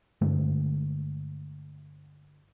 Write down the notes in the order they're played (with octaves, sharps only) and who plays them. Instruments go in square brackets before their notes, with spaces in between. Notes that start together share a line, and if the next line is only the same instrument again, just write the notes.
[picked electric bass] G2 D3 G#3 A3